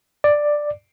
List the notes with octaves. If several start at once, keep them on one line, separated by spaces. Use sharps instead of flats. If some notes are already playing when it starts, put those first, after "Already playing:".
D5